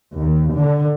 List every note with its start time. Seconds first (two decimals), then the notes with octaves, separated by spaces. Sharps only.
0.17 D#2
0.58 D3